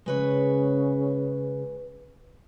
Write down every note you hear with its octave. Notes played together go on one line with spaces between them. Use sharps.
C#3 G#3 B4 C#5